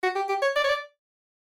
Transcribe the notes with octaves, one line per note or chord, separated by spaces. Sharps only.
F#4
G4
G4
C#5
D5
C#5
D5